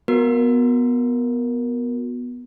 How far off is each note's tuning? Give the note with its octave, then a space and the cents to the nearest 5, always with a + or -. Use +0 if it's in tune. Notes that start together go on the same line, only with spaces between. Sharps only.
B3 -5 F#4 -25 A#4 +5